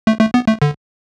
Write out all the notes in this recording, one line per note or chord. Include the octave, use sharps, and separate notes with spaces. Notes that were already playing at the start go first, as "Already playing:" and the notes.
A3
A3
B3
A3
D3